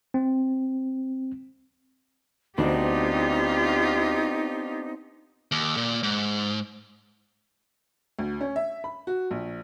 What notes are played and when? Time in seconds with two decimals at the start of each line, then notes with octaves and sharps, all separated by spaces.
0.14 C4
2.58 D2 B3 C4 D4 D#4 F4 G4
5.52 D#2
5.77 A#2
6.03 G#2
8.19 D2
8.41 C#4
8.56 E5
8.84 B5
9.07 F#4
9.31 A#1